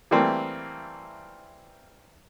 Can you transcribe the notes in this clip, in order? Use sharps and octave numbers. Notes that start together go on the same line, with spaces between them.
E3 G3 A3 A#3 C4